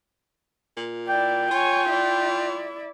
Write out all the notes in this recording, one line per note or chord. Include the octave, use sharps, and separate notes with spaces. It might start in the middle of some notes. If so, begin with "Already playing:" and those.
A#2
E4 D5 G5
F4 C#5 G#5
E4 D5